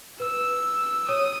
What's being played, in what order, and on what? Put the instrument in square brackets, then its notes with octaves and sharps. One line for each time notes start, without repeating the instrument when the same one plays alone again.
[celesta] B4 [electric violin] E6
[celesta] C#5 [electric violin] D#6